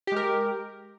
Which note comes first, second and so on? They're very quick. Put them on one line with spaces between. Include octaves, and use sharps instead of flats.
G4 G#3 A#4